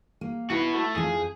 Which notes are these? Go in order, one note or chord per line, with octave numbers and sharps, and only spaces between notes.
A#3
E4 F#4 B4
A3
F2 F3 G#4